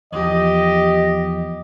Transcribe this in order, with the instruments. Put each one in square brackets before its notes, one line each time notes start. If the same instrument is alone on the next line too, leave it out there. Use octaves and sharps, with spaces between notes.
[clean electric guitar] E2 F3 [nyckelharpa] G4 [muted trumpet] D#5